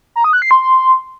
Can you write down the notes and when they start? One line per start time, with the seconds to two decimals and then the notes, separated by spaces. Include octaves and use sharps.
0.16 A#5
0.24 D#6
0.33 F#6
0.42 C7
0.51 C6